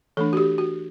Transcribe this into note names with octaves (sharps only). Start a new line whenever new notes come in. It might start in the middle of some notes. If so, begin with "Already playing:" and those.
E3 A3 D4 A4
F#4
G4
F#4